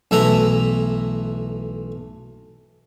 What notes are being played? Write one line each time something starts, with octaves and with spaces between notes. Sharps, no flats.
B1 E3 A3 E4 B4 A#5